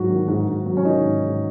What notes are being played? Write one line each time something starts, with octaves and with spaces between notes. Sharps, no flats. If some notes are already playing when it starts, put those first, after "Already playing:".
Already playing: G#2 F#3 F#4
D#3
G#2
G#2
F#3
C#4
D#3 D#4
G#2
G#2